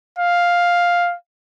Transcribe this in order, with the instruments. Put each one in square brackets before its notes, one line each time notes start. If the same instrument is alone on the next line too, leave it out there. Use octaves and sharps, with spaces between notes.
[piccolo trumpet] F5